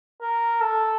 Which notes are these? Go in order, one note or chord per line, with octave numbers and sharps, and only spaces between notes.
A#4
A4